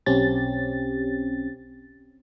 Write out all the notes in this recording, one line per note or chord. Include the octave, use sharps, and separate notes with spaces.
B1 C4 C#4 G4 A6